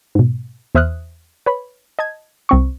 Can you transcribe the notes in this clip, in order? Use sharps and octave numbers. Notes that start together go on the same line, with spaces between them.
G#2 B2
E2 C5 E5 D#6 F6 F#6
B4 C#5 B5
D#5 A5 G#6
C2 C4 C#6